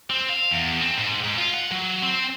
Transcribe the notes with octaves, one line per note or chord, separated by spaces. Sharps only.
C4
F5
E2
C4
G#2
G#2
F4
F#5
F#3
C4